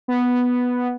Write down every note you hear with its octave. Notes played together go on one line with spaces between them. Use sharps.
B3